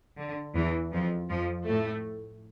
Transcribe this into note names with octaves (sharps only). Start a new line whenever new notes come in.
D3
E2 E3
F2 F3
F2 F3
A2 A3